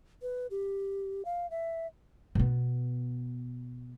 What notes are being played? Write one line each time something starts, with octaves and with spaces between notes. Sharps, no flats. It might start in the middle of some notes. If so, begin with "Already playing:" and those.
B4
G4
F5
E5
B2 B3